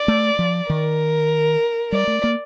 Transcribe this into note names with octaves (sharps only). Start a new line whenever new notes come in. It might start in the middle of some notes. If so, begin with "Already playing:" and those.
Already playing: D5
A3
F3
D#3 A#4
G3 D5
A3
A#3